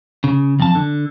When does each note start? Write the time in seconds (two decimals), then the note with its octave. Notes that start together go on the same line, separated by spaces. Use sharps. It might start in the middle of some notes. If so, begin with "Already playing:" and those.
0.24 C#3
0.60 F2 A5
0.75 D3